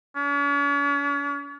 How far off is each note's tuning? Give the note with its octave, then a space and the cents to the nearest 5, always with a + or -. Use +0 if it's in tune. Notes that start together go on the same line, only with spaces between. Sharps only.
C#4 +45